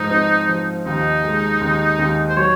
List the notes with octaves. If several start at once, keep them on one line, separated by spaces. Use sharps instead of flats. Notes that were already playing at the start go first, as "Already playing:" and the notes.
Already playing: G#2 F3 D#4
C4
F3
D#2 D#4
G#3
D#2
D#2
C5
F#3 C#5